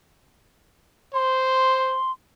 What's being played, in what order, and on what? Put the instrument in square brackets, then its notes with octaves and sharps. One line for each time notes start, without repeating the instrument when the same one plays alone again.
[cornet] C5 [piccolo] C6